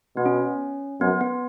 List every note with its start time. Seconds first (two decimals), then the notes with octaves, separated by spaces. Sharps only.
0.16 B2 B3
0.26 C#4
1.01 F#2 B3
1.21 B3